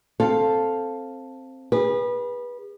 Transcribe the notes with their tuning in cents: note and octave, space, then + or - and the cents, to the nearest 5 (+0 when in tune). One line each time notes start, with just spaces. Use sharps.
C4 +10 A4 +0 F5 +0
G#4 -40 B4 -20